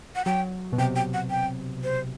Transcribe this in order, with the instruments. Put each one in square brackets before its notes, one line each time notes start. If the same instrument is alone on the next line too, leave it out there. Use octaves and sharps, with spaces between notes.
[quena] F#5
[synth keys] F#3 [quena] G5
[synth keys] B2
[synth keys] C3 [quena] G5
[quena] G5
F#5
G5
C5